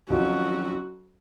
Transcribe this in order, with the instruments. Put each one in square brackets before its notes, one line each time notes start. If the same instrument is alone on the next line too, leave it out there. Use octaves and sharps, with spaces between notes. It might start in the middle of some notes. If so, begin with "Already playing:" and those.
[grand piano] F2 D#3 F#3 C#4 F4 [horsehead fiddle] F#4